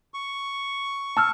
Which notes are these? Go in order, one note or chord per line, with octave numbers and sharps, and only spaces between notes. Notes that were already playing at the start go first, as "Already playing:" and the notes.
C#6
A5 E6 F6